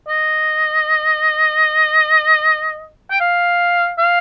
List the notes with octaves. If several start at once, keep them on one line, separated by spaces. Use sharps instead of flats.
D#5
G5
F5
F5